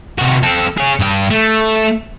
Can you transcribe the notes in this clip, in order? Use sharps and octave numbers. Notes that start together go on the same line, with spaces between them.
C3 F#4
C4 A4
G#4 C#5
G2 G5
A3